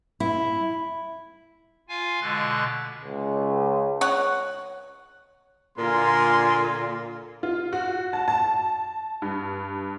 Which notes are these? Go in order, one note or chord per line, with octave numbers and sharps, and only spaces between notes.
E4
F4 F5 G#5
B2 D3 G#3 F#6 A6
C#2
C#5 F#5
A#2 D3 F4 A#4 G#5 C6
F4
F#4
A5
A5
G2